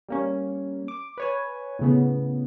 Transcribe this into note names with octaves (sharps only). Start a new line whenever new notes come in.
G3 A#3 C#4
D6
B4 C#5 G#5
A2 C#3 B3